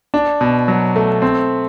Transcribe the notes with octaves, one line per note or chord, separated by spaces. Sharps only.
D4
B2
F#3
A3
C4